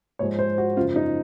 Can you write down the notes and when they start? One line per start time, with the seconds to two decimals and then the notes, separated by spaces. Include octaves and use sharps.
0.19 G#2 F3 G#3 C#5
0.39 C5
0.58 F#4
0.77 F#2 C#3 F3 F4
0.96 D#4